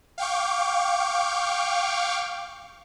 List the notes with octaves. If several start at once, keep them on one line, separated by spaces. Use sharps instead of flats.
F5 G5 C#6 D6